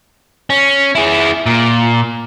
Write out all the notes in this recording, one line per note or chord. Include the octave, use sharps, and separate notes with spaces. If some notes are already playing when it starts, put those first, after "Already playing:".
C#4
E4 G#4
A#2